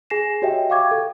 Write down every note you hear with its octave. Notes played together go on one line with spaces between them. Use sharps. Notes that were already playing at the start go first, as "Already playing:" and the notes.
G#4 G#5 A#6 C7 E7
F#4 G4 C#5 D#5 E5 G5
F5 G5 C#6 D6 G#6
A4